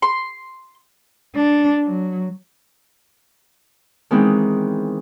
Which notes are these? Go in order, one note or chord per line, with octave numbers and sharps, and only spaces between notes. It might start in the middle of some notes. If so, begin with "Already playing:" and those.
C6
D4
F#3
D#3 E3 G#3 B3 C4